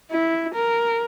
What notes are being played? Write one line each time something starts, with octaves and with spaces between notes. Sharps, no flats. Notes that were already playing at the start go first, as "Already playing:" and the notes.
E4
A#4